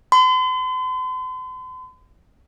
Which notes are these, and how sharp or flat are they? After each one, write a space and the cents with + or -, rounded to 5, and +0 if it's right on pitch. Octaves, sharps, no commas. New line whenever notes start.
C6 -45